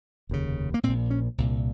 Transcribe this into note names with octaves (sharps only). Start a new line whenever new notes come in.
F1 D#2 C#3
A#3
A#1 A#2 C4
C#4
C2 A#2